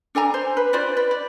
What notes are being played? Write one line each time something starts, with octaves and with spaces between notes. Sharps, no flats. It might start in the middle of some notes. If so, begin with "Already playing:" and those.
D4 A4 G#5 A#5
C5
B4
F4 B4 C5 D5
B4
D5